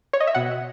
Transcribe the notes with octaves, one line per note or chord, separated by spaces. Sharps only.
C#5
D#5
E5
B2 F#5